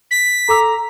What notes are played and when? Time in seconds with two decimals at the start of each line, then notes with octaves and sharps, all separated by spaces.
0.11 B6
0.49 A4 A#5 D6 E6